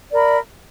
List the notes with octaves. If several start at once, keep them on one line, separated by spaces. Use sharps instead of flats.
A#4 D5 E5 B5